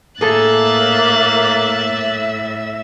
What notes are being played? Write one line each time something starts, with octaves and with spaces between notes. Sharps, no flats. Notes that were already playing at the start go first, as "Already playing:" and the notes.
A2 A#3 G#4 A4 E5 F#6 A6